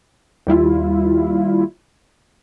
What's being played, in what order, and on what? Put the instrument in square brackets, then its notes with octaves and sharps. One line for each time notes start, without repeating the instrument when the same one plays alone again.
[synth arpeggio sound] D#2 G3 E4 F4